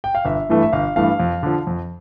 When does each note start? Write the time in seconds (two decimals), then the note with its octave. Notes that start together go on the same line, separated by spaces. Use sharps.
0.04 G5
0.15 F5
0.25 G1 E5
0.49 G2 E3 A3
0.62 E5
0.73 G1 F5
0.96 G2 E3 A3 F5
1.20 F2
1.43 D3 F3
1.67 F2